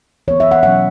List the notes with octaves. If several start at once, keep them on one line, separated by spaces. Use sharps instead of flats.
E3 B3 C#5
E5
F#5
B2 F#3 C#4 F#5